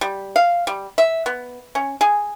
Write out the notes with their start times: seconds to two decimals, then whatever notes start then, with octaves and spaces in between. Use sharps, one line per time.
0.01 G3
0.36 F5
0.67 G3
0.98 E5
1.26 B3
1.75 C#4
2.01 G#4